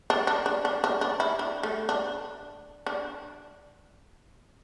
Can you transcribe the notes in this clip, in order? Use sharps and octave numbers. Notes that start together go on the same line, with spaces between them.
D4
D4
D4
D4
D4
D4
E4
D4
A3
D4
D4